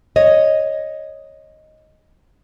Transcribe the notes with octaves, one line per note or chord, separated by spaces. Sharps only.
C#5 D#5